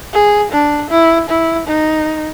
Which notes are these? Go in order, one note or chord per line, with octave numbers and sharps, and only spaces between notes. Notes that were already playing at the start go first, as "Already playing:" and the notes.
G#4
D4
E4
E4
D#4